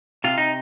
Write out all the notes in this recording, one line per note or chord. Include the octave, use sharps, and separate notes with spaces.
C3 F4
D#4